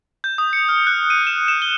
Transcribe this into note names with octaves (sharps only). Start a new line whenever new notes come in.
G6
D#6
C#7
F6
F#6
D#7
E7
E7
G7